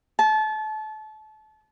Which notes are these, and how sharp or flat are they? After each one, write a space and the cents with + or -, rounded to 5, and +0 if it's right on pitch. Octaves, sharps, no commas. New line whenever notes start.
A5 -30